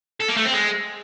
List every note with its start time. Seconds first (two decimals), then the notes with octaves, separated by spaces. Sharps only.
0.20 A4
0.28 A#3
0.37 A3
0.45 C4
0.53 G#3